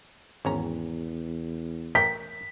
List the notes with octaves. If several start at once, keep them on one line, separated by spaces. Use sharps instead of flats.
G#1 E2 C#4 A#5
A1 A#4 G5 B6